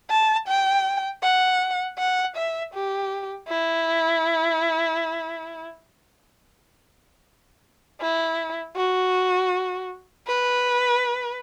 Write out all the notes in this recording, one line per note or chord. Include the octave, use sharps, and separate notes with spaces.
A5
G5
F#5
F#5
E5
G4
E4
E4
F#4
B4